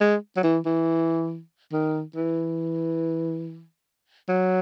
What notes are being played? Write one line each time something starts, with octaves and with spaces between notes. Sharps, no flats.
G#3
F#3
E3
E3
D#3
E3
F#3